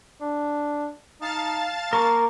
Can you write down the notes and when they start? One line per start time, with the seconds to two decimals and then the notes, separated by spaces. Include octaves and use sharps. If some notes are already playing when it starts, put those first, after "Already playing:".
0.21 D4
1.21 D#4 F5 A5 A6
1.93 A#3 A#4 C#6